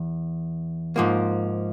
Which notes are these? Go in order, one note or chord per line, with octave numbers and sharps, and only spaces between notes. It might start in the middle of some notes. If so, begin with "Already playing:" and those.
Already playing: E2
G#2 F3 A#3